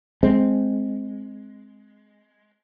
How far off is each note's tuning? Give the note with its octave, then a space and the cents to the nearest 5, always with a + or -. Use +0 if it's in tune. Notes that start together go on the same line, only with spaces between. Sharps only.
G#3 +10 C4 +0